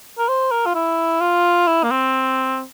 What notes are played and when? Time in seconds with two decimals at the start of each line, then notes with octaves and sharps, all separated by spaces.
0.19 A#4
0.28 C5
0.51 A#4
0.66 F4
0.75 E4
1.21 F4
1.67 E4
1.83 A#3
1.91 C4